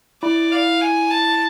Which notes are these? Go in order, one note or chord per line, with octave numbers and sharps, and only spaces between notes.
E4 D5
F5
G#5
A5